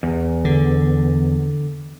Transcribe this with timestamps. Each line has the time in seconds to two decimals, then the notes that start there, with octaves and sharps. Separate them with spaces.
0.03 E2
0.45 D3